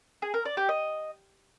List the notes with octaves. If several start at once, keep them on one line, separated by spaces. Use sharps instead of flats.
G#4
A#4
D5
G4
D#5